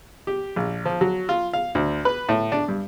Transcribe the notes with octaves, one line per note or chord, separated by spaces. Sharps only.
G4
A#1
F3
F#3
F4
F5
D2
B4
A2
D4
G2